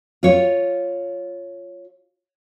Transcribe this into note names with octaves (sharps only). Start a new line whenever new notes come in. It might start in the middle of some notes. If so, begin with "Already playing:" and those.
F4 C#5